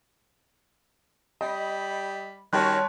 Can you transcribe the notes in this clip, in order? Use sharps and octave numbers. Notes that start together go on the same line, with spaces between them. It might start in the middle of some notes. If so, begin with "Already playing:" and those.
G3 D#5 B5
D#3 G3 C#4 F#4 C#5 A5 C6 F#6